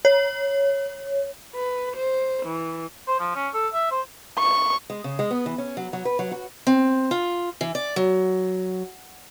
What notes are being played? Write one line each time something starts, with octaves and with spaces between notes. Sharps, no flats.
C#5
B4
C5
E3
C5
F3
C#4
A4
E5
C5
C#6
G#3
C#3
G#3
B3
E3
C#4
F#3
F#3
B4
F#3
F#4
C4
F4
E3
D5
F#3